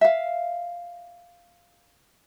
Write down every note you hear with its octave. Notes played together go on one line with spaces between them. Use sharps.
E5 F5